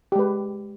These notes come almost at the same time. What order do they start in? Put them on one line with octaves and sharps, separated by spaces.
G4 G#3 B4